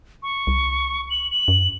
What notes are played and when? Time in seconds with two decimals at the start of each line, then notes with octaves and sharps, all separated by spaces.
0.23 C#6
0.47 C2
1.10 F#7
1.31 F#7
1.48 F#2